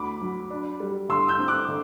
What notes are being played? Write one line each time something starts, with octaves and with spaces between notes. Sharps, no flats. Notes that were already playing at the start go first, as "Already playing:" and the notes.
Already playing: D2 B5 D6
F#3
D4
G3
D3 C6 E6
E6 G6
C4
D6 F#6
D3